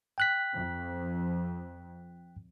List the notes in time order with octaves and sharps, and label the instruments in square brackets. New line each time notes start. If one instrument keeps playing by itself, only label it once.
[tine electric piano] G5 F#6 B6
[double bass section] F2